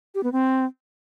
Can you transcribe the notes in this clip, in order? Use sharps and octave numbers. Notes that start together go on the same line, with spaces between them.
G4
B3
C4